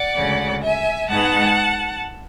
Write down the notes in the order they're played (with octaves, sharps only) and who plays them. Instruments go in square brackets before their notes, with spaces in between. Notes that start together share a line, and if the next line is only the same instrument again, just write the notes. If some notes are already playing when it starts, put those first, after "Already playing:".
Already playing: [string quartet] D5 F#5
D2 C#3 G#3
E5 G#5
G#2 G#3 B3 F#5 A5